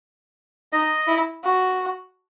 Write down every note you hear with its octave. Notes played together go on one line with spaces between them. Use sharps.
D#4 D#5
E4
F#4